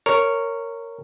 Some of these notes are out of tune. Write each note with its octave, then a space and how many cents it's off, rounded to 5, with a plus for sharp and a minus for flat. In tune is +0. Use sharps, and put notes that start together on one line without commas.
A#4 -15 C#5 +0